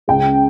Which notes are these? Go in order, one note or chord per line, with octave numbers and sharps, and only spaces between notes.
C#2 C#3 G#3 G5